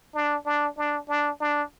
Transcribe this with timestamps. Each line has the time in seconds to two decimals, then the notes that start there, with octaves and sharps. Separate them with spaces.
0.15 D4
0.46 D4
0.78 D4
1.09 D4
1.41 D4